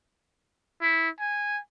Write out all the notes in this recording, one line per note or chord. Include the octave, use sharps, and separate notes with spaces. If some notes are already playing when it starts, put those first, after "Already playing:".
E4
G#5